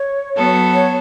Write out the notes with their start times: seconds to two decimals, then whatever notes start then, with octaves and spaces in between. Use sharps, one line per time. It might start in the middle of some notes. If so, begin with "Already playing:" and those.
Already playing: C#5
0.35 F#3 B3 F#4 A4
0.73 C#5